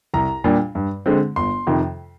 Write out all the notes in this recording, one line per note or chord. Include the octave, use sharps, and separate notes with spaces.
C2 A#5
A#2 G3 D4
G2
D3 G#3 C4
G1 C6
F2 C3 D#3